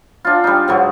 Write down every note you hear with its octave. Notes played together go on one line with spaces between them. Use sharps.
D4 F4
G3 D#4
G#2 D3 F#3